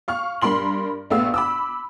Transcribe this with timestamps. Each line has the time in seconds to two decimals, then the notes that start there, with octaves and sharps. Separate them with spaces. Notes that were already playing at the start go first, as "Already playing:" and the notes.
0.08 F5 C#6 F6
0.42 G2 A#4 B5 C6 F#7
1.10 A#1 A3 B3 F5 E6
1.34 B5 D6 E6